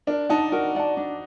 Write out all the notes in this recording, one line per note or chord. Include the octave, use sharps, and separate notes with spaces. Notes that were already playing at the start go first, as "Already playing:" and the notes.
D4 A#4
D#4 D5 F#5 A5
F#4 A#4
D5 F#5 A5
D4